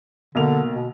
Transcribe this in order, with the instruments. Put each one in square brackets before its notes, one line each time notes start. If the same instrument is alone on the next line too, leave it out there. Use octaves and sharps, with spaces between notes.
[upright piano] B1 A#3 F7 [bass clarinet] D3
[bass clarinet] B2